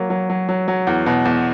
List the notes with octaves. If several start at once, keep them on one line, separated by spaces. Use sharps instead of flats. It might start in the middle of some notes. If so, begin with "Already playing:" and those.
Already playing: F#3 A#3
F#3
F#3
F#3
F#3
E2
B2
E2